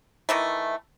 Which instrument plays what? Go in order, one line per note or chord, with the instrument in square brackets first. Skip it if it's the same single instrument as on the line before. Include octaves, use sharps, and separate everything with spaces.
[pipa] D#3 E3 A3